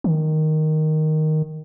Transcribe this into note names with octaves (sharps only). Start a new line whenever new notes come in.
D#3